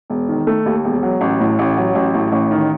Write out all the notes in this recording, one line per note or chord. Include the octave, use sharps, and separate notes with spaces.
E1
D#3
A3
D#2
E1
F#3
A1
A2
A1
F#3
A1
A2
A1
D#3